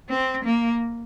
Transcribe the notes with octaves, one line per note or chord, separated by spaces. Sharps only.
C4
A#3